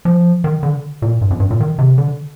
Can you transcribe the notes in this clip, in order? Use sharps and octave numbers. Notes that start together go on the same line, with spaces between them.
F3
D#3
D3
A#2
G2
F2
G2
A#2
D#3
C3
D3